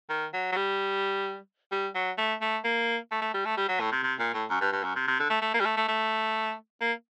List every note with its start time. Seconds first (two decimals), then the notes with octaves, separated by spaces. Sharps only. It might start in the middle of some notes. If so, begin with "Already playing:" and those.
0.09 D#3
0.34 F#3
0.52 F#3
0.56 G3
1.72 G3
1.95 F#3
2.18 A3
2.41 A3
2.64 A#3
3.11 A3
3.22 A3
3.34 G3
3.45 A3
3.57 G3
3.68 F#3
3.80 A2
3.92 C3
4.03 C3
4.19 A#2
4.34 A2
4.50 F#2
4.61 G2
4.73 G2
4.84 F#2
4.95 C3
5.07 C3
5.19 D3
5.30 A3
5.41 A3
5.54 A#3
5.60 G3
5.65 A3
5.77 A3
5.88 A3
6.81 A#3